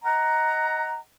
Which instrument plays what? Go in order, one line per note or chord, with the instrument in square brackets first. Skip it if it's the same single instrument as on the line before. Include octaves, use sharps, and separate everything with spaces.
[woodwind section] D#5 F#5 A#5